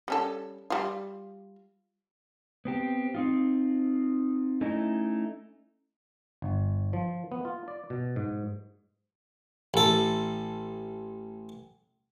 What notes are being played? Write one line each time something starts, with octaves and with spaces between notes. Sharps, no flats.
G3 C#4 A4
G3 F4
B3 C4 G4
C4 D#4 F4
A3 C#4 D#4 E4 D#5
G1
F3
B3
F4
D5
B2
G#2
A1 A4